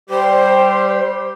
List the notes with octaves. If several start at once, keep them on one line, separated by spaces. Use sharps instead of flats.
G3 G4 C5